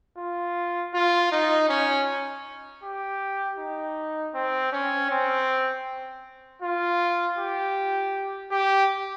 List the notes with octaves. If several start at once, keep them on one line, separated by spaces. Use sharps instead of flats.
F4
F4
D#4
C#4
G4
D#4
C4
C#4
C4
F4
G4
G4